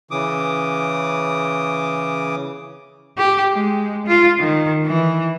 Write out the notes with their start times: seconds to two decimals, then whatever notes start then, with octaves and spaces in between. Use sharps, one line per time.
0.11 C#3 E3 D6 D#6
3.17 G4
3.53 G#3
4.07 F4
4.39 D#3
4.86 E3